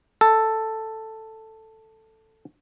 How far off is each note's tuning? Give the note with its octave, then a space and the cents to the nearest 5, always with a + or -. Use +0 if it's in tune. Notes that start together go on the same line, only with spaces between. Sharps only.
A4 +5